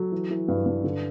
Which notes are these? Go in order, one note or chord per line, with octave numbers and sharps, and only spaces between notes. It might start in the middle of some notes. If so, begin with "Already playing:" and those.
Already playing: F#3 A4
E3
E3
G2 B4
G2
D3